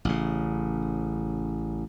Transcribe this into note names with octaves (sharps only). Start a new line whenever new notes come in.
A1 C#3